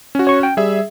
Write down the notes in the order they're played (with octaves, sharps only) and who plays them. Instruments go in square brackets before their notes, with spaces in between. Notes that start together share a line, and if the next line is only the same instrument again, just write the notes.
[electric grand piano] C#4 F#4
[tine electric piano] C#5 C#6
G5
[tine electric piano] G3 [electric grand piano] G#4 E5